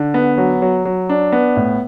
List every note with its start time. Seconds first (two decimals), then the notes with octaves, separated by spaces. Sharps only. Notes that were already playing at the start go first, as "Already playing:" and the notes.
Already playing: D3
0.14 B3
0.38 F#3
0.62 F#3
0.85 F#3
1.09 D4
1.33 B3
1.56 A2